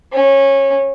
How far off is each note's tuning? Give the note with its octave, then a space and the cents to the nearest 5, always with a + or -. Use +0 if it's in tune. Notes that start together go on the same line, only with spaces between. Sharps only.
C#4 -20